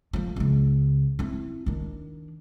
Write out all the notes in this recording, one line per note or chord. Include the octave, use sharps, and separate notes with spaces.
F3 A3
C#2 C#3
C4 E4
D#3 D4